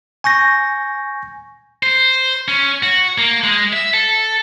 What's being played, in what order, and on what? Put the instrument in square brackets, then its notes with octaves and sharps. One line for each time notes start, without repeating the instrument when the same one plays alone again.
[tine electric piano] G#5 C#6 G6 A#6
[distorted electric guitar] C5
C#4
F#4
A#3
G#3
E5
A4